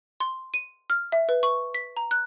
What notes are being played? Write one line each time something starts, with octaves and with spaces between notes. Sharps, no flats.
C6
D#7
F6
E5
B4
C#6
B6
A#5
F#6